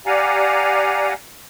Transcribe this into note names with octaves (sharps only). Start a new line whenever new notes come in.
G4 D5 F5 F#5 G#5 A#5